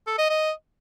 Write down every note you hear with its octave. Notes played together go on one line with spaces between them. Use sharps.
A4
D#5
D#5